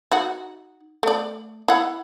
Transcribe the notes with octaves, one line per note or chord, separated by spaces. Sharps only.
D#4 F#4 F#5
A3 D5
E4 F#5